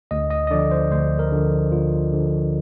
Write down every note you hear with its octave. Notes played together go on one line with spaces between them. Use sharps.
D2 D#5
D#5
D#5
D3 F3 D5
C5
D2 C5
A#4
D3 F3
D2 F4
D3 F3